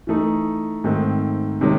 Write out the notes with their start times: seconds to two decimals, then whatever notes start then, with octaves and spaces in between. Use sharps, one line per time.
0.07 E3 A3 D#4
0.84 G#2 D#3 A3 C4
1.61 C3 D#3 G#3 C#4